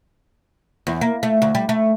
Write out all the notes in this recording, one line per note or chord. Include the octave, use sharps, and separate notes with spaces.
E2
A#3
A3
D2
G3
A3